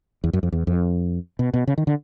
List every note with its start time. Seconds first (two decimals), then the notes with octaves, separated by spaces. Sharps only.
0.24 E2
0.33 F#2
0.43 F2
0.52 E2
0.67 F2
1.39 B2
1.54 B2
1.67 C#3
1.78 D#3
1.87 D3